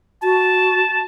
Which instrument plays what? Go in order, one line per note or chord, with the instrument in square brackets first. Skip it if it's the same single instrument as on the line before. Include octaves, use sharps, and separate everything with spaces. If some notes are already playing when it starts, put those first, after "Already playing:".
[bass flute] F#4 [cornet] A5